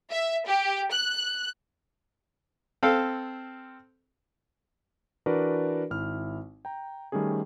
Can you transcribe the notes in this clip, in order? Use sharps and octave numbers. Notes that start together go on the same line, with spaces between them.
E5
G4
F#6
C4 A4 F5
E3 D4 F#4 A#4 B4 D5
G#1 E4 F6
G5 A#5
D#3 G3 A3 C#4 G#4